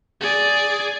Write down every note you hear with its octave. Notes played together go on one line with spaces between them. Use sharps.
G#4 D5